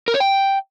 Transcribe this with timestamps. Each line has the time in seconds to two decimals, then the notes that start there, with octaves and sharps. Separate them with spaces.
0.08 A#4
0.14 C#5
0.20 G5